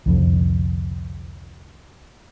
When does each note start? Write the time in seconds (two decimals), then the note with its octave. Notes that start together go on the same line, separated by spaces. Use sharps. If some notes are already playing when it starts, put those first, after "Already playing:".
0.06 C2 F2 D3